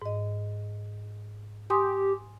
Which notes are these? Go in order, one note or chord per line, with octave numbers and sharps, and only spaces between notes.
G#2 D#5
G4 G#5 C6 D#6